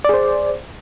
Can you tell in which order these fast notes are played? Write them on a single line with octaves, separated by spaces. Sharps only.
D5 G#4 C5